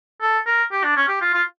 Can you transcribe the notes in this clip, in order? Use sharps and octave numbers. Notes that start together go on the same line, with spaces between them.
A4
A#4
G4
D4
C#4
G4
F4
F4